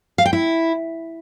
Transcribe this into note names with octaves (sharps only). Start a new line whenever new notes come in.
F5
G5
E4